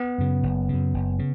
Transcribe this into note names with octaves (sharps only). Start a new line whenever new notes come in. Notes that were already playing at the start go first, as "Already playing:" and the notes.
Already playing: B3
F#2 C#3
F#1
F#2 C#3
F#1
C#3